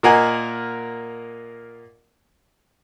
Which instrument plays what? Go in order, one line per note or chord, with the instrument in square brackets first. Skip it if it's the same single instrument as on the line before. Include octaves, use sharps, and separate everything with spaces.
[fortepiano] A#2 A#3 A#4 D#5 F#5 G#5